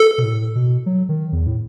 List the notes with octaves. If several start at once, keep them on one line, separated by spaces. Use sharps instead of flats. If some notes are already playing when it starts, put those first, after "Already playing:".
Already playing: A4
B2
A2
B2
F#3
D#3
E2
A2